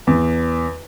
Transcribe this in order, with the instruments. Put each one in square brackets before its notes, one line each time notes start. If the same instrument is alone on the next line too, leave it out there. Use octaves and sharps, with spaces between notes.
[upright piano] E2